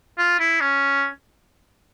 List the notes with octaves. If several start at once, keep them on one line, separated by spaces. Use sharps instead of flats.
F4
E4
C#4